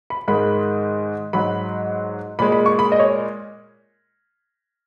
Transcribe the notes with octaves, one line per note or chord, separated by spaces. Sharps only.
B5
G#2 D#3 G#3 B5
G#2 F#3 B5
A#2 G#3 B5
B5
C#6
B5
D#5
C#5